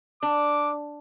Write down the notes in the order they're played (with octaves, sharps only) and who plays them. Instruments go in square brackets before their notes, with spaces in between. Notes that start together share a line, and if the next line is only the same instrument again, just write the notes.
[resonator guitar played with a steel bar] D4 [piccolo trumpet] D6